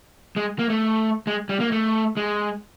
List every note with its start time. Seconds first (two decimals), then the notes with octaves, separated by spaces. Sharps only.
0.36 G#3
0.59 A#3
0.70 A3
1.27 G#3
1.49 G3
1.60 A#3
1.72 A3
2.17 G#3